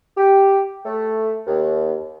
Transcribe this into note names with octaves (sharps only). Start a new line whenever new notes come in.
G4
A3
D#2